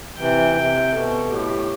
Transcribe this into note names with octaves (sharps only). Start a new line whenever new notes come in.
C3 E3 G5
C3
B2 A4
A2 G4